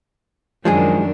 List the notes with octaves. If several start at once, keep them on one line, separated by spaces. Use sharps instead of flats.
F#2 D#3 F3 G#3 D4 G#4